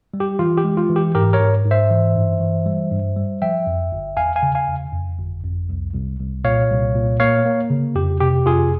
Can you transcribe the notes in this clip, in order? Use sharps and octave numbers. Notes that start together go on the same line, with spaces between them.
G3
G4
E3 F4
G4
G#3
F4
E3
G4
G#2 G4 A#4
A#4 C#5
G#2
G#2
C5 E5
E3
G2
E3
G3
G2
G3
F3 E5 G5
F2
G1
E2 F5 G#5
F5 G#5
C#3
F5 G#5
E2
F2
G1
F2
C2
C2
C2
A#2 C#5 F5
C2
A#2
A#3 C#5 F5
A#3
C#3
F2 G4
C3 G4
F2 F4 G#4